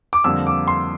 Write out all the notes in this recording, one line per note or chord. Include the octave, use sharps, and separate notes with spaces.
D6
F2 D3 G3 A#3 E6
D6
C6